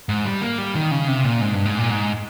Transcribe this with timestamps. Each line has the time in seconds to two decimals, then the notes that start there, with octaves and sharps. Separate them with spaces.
0.09 G#2
0.25 G3
0.42 A#3
0.58 G3
0.75 D#3
0.91 C#3
1.08 C3
1.24 A#2
1.41 G#2
1.53 G2
1.66 G#2
1.78 A#2
1.90 G#2